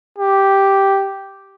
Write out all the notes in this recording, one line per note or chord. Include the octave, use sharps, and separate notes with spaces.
G4